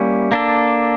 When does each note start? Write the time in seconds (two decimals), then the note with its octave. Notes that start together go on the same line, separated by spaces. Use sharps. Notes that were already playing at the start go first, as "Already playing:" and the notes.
Already playing: G3 A#3 C#4 E4
0.32 A#3 D4 A4